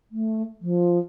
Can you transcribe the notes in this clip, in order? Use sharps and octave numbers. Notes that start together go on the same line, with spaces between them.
A3
F3